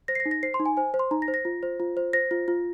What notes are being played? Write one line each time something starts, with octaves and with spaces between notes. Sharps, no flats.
C5 A#6
C7
A#6
D#4
A#6
C5 C7
C6
D#4
G#5
C5 G#5
C5
C6
D#4 A#5
A#6
C5
A#6
F4
C5
F4
C5
C5 A#6
F4
F4